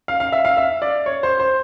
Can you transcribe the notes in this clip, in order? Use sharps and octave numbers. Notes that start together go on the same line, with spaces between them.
F5
F5
E5
F5
E5
D5
C#5
C5
C5